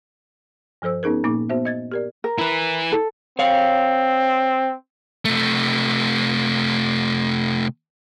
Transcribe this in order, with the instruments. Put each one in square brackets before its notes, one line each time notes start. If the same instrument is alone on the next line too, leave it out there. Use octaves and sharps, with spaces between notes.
[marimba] G2 F3 A4 C5 E6
B3 C#4 D#4 G#4 A#4
A#2 A#3 D#4 D6
B3 F#4 C5 E5
D#5 G#6 A6
G4 A#4 D5
[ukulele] A#4
[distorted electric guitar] E4 B4
[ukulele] A4
[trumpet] C4 [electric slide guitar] C#5 F5
[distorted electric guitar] C3 A3